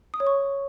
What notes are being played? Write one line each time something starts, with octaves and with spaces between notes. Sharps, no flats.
D#6
C#5
C#6